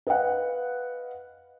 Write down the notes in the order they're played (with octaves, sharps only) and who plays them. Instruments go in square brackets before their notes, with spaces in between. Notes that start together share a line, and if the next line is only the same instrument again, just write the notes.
[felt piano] B4 D#5 F5 F#5